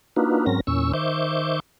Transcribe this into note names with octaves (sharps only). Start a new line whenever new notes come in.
A#3 D4 D#4 F4 F#4 B4
G#2 F#3 C4 C#4 A#4 A#6
E2 A#2 C#4 C#6 E6
D#3 C5 E5 C#6 D6 G6